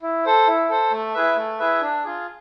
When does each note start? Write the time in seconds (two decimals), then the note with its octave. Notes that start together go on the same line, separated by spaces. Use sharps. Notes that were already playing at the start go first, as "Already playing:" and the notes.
0.02 E4
0.25 A4 C5
0.48 E4
0.69 A4 C5
0.91 A3
1.14 E4 G#4 B4 E5
1.37 A3
1.59 E4 G#4 B4 E5
1.81 D4
2.04 F4 G#4